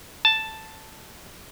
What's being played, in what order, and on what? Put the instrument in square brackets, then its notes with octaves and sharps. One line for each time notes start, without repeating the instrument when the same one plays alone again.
[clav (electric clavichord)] A5